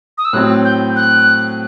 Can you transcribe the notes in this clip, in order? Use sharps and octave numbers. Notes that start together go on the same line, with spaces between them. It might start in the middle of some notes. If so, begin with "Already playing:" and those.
D#6
E6
A2 F#3 C4 F#6
G6
F#6